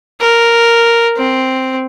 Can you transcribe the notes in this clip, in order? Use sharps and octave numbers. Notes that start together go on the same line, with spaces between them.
A#4
C4